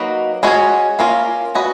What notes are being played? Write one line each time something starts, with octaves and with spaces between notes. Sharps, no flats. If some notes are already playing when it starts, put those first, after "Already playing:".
Already playing: F#3 A#3 D#4 F#4 B4
G#3 C#4 F#4 C#5
A#3 C#4 F4 A#4
C#4 F#4 B4 D#5